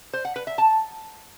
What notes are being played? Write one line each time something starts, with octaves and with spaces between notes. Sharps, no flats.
C5
F#5
B4
E5
A5